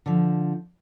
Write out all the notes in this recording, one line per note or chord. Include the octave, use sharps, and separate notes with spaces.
D3 F3